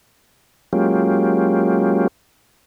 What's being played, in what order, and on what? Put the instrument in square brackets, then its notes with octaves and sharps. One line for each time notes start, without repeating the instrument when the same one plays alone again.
[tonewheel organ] F#3 G#3 A#3 C#4 F4 G4